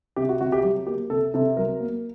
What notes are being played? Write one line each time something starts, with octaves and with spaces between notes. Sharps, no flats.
C3 G4
F#4
C3 F#4
G4
F#3 G4
A#3 G4
C3 A4
C3 A4
F#3 A#4
A#3